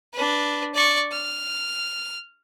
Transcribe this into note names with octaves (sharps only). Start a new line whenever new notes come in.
D4 B4
D5 C#6
F6